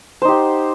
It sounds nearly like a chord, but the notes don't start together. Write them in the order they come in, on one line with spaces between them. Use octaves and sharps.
C5 D#4 G4 F#5